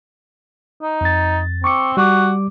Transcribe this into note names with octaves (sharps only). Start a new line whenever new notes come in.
D#4
F2 A6
C4 C#6 D6 C#7
G3 F#4 D6